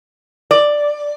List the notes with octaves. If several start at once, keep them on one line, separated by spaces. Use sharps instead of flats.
D5